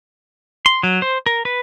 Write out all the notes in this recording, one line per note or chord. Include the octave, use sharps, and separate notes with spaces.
C6
F#3
C5
A#4
B4